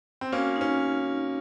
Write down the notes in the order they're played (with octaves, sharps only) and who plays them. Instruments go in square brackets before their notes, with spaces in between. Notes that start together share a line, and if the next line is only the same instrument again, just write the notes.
[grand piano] C4
[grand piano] A#3 C#4 [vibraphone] F#4
[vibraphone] D#4
[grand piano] C#4